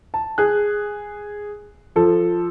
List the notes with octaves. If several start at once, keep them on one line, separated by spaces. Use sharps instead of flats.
A5
G#4 F#6
F3 A4